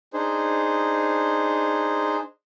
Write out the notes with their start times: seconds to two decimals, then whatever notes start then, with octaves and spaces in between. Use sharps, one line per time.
0.13 D4 D#4 G#4 C5